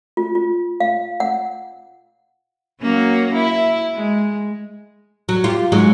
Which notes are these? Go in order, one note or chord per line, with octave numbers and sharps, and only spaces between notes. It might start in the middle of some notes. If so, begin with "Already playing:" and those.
F4
F4
F5
F#5
F#3 A#3 C#4
E4
G#3
F#3
F4 G4
G#2 F#3 G#3